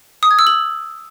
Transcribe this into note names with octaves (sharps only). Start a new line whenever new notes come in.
D#6
G#6
E6
F#7